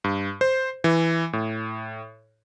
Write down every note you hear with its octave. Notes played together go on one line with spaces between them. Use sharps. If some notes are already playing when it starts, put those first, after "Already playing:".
G2
C5
E3
A2